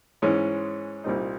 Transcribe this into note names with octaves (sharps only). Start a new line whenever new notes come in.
G#2 E3 G#3 C#4
C2 A#2 G3 C4 D#4